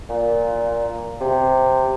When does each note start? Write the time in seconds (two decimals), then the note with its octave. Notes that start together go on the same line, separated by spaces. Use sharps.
0.10 A#2
1.21 C3